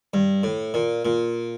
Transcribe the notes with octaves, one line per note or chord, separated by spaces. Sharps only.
G2
A2
A#2
A#2